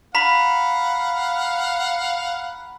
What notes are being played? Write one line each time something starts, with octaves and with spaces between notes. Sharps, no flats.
F5 F#5 A#5 B5 B6